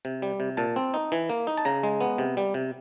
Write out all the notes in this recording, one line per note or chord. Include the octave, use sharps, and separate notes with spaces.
C3
G3
C3
A#2 A5
C4
D#4
E3
A#3
D#4
A5
C#3 A#5
G#3
B3
C3
G3
C3